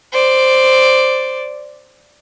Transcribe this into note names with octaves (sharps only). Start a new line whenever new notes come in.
C5 D5